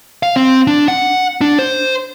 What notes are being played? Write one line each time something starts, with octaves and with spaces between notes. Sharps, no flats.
F5
C4
D4
F#5
D4
C5